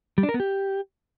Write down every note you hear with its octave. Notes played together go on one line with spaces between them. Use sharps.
G3
D4
A#4
B3
G4